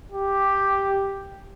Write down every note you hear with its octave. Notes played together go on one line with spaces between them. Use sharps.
G4